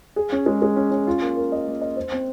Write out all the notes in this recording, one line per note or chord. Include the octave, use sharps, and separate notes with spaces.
G#4
C#4
G#3
G#3
C#4
C#4
F4
A#3
A#4
D#5
A#3
D#5
C5
C4